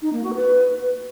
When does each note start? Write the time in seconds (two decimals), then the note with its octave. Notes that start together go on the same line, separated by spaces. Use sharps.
0.02 D#4
0.13 A#3
0.23 F#4
0.34 B4